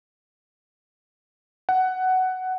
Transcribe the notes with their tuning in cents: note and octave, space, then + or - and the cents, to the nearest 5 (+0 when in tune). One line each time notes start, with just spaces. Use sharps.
F#5 +10